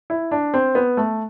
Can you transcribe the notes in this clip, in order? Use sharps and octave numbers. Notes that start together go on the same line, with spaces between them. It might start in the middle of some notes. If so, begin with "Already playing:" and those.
E4
D4
C4
B3
A3